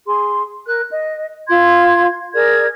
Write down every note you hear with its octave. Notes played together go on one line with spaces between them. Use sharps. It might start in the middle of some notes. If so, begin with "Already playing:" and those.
G#4 C6
A#4 F#6
D#5
F4 C6 G#6
G#4 A#4 D5 G#6